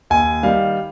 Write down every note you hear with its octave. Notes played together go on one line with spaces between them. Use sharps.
D#2 G#5
D#3 G3 F5